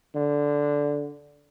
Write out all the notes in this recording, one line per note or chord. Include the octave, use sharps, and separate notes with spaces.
D3